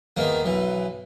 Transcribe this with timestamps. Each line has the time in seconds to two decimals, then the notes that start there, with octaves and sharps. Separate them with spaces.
0.17 E2 D#3 A#3
0.44 B1 E3